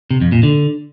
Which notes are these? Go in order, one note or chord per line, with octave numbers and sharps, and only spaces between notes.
C3
F2
A#2
D3